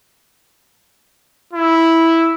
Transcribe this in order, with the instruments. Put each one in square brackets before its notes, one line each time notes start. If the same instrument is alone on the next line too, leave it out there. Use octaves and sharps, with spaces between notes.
[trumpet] E4